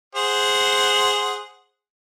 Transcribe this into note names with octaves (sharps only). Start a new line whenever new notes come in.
G#4 C5 F#5